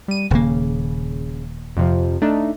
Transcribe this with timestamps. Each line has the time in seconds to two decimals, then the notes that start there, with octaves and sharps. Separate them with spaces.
0.08 G3 D#7
0.31 D#1 C#3 A#3
1.77 F2 C3 F3
2.22 A3 D4 D#4